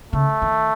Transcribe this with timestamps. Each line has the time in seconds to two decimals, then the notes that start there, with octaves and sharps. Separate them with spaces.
0.13 C#3 A3
0.42 D#3